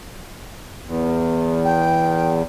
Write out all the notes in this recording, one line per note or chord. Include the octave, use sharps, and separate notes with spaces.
E2
G5